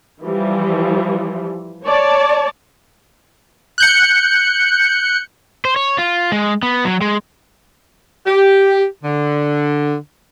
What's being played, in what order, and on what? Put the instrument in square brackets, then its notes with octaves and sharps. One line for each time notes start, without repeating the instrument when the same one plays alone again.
[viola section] E3 F3 G3
C#5 D5 A5
[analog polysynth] F#6 G6 C#7
[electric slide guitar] C5
C#5
F4
G#3
B3
F#3
G#3
[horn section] G4
D3